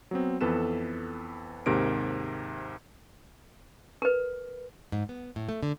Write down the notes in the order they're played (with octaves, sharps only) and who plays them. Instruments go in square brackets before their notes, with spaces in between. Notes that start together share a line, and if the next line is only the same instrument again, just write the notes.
[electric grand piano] F#3 B3 C4
F2 E3 B3 A4 B4 E7
D#2 G#2 C3 A#4 D7
[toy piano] A#4 B4
[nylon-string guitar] G#2
B3
A2
A3
D3